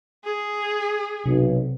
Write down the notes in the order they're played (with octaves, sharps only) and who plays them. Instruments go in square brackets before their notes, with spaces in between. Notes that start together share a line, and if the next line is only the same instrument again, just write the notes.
[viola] G#4
[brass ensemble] B1 [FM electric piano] C3